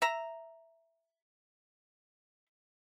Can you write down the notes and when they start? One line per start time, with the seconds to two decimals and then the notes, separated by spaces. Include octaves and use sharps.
0.02 E5 A#5